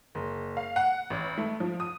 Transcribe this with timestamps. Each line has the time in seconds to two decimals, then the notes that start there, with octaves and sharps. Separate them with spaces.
0.15 F#1
0.57 F5
0.76 F#5
1.10 A1
1.38 A3
1.60 F3
1.80 D#6